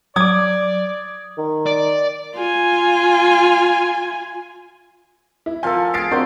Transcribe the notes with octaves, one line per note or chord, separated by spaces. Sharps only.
F#3 D5 D6 D#6 G#6
D#3
D5
F4 G#5
E4
F3 A4 A#4 F5 G#5
G#4 F5 A6 C7 D7
C4 D4 F#4 A#4 C5 C6